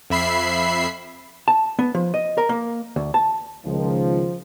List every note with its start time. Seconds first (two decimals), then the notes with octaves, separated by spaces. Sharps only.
0.10 F2 E5 B5 C7
1.48 A5
1.79 B3
1.95 F3
2.14 D#5
2.38 A#4
2.49 A#3
2.96 D2
3.14 A5
3.65 C#2 D#3 F3